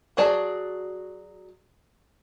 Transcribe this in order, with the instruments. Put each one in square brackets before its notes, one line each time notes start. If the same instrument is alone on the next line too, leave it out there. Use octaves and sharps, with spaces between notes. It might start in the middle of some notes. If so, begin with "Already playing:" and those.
[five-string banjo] F#3 F#4 G#4 D5 A5